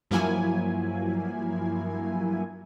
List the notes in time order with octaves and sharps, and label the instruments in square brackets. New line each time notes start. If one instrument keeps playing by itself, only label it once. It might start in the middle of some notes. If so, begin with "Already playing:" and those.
[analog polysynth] G2 F3 F#3 A#3 E4 G#5